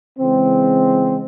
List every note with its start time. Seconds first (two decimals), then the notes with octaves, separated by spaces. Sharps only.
0.19 C#3 E3 G#3 C4